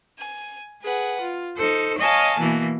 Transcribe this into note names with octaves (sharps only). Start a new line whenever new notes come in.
G#5
G#4 B4 F#5
F4
D#4 A4 C5
C#5 D#5 F5 G#5 A5
B2 E3 A#3